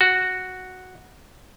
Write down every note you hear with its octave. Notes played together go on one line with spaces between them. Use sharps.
F#4